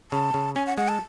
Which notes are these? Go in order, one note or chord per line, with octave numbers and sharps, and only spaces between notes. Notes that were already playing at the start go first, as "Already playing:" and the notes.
C#3 A5
C#3
C#4 G#5
F#5
G#3 F#5
A5